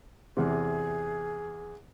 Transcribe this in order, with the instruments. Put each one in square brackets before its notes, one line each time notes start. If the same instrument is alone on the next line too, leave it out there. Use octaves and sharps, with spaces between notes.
[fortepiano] E2 C3 [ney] G#4